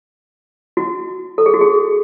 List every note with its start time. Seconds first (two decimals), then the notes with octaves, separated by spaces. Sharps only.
0.77 F#4
1.38 A4
1.46 G#4
1.54 F#4
1.61 G#4